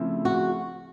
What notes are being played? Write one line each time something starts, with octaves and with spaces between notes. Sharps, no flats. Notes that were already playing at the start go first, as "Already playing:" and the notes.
Already playing: C#3 F3 A3 C4 E4
F#4